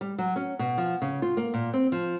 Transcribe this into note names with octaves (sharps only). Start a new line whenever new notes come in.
G3
F#3
C#4
B2
F3
C#3
F4
A#3
A#2
C4
F3